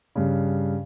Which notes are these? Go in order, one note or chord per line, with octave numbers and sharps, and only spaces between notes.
G2 C#3